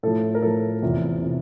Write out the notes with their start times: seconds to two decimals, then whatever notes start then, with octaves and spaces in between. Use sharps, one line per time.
0.03 A2 F3 A4
0.35 A#4
0.42 A2 F3 A4
0.82 E2 C3 F3
1.22 C3 F3